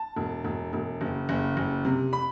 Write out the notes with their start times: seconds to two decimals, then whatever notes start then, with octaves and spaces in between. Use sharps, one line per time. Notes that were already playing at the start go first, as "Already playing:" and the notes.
Already playing: A5
0.16 E1
0.45 E1
0.73 E1
1.01 F#1
1.29 F#1
1.57 F#1
1.85 C3
2.13 B5